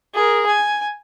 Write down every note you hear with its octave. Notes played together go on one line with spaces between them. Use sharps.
G#4 A#4
G#5